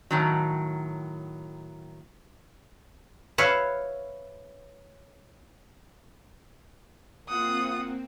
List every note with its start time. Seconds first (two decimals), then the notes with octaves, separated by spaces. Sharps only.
0.11 A2 D#3 F#3
3.38 B4 C#5 E5 F5
7.28 A#3 C4 F4 F#5 D#6